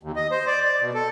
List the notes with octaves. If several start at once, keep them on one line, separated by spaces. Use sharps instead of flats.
D#2
D#5
C5
D5
D5
B2
A4